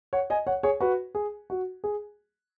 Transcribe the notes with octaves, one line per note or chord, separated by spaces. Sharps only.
C#5 F#5
D#5 G#5
C#5 F#5
G#4 C#5
F#4 B4
G#4
F#4
G#4